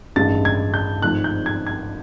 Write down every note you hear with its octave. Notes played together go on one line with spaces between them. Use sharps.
A1 G2 D#3 G#3 A6
G#6
G6
G#1 G#2 F3 A3 F#6
G6
G#6
G#6